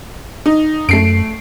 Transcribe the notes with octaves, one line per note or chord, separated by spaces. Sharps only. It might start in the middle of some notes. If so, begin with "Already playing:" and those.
D#4
F#2 A3 C7 D7